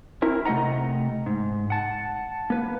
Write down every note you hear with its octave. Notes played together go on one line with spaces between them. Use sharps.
C4 E4 A#4
C3 A3 F4 D#5 F#5 A#5
G#2
F#5 A5
A#3 B4